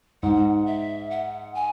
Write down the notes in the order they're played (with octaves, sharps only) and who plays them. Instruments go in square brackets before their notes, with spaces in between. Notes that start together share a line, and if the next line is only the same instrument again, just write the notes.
[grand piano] G#2 [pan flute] F#5
[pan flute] E5
F#5
G#5